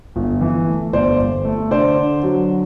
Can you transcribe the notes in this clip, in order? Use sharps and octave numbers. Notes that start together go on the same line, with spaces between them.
G1
E3
A3
G1 C5 D5
G1
A3
D3 C5 D5
D3
F#3